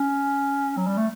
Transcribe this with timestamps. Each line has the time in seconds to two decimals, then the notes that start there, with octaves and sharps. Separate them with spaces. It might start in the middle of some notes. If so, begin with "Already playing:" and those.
Already playing: C#4
0.77 F#3
0.87 G3
0.98 A3